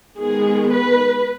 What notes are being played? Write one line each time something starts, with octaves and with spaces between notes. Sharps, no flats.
D#3 G#3 B3 G#4
B4